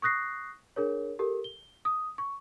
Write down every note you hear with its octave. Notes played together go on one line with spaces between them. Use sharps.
C#6 D#6 F#6 A#6 C7
D4 G#4 A#4 C#5
G4 A4 A#4
G7
D#6
C#6